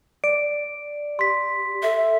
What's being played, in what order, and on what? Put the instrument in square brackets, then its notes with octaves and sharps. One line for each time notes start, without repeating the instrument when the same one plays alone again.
[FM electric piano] D5 [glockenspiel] D7
[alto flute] G4 [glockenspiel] C6 B6
[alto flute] A4 [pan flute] E5